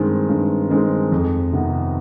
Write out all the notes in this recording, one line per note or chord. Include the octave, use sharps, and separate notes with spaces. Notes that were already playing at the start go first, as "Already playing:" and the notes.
Already playing: G2 D#3 G#3 C4
G2
D#3 G#3 C4
F2
C3 D#3 B3